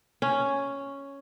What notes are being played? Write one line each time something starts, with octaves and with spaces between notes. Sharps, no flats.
C#4